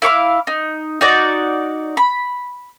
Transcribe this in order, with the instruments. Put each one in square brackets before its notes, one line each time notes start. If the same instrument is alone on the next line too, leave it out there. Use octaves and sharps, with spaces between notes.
[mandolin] E4 F5 C#6 D6
D#4
D#4 F#4 D5
B5